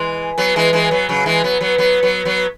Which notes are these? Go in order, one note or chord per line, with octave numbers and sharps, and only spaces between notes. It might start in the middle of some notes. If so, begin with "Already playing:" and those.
Already playing: E3 G#3
F#3 B3
E3 G#3
E3 G#3
F#3 B3
C#3 F#3
E3 G#3
F#3 B3
F#3 B3
F#3 B3
F#3 B3
F#3 B3